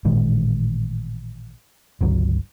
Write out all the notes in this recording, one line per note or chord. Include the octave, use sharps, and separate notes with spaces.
A1 A#2 D#3 G#3
G1 C#2 F#3